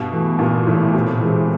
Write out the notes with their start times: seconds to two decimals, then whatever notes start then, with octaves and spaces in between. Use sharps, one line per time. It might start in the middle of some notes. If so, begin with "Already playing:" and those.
Already playing: G2 B2
0.12 E3 A3
0.39 G2 A#2
0.67 A2 E3 A3
0.94 C3
1.21 E3 G#3 C4